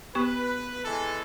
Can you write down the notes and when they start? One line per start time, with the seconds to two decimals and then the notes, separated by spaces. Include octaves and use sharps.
0.15 B3 G4 B4 C#6
0.85 E3 G#3 A4